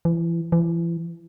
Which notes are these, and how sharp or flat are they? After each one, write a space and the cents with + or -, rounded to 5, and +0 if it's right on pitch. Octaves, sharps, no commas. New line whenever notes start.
E3 +30
E3 +35